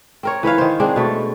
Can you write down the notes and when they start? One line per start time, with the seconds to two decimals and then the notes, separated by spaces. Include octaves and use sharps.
0.23 C4 A#4 C#5
0.43 E3 B4 C#5 F5
0.58 D#3 C5
0.80 G#3 C4 D4 G#4
0.96 B2 A3